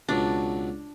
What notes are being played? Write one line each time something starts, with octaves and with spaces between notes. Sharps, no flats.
C#2 B2 F#3 D4